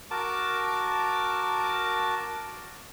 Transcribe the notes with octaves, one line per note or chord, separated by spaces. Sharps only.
F#4 A#4 A5 D6